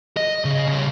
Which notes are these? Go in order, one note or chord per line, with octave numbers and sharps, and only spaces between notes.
D#5
C#3
C#3 G3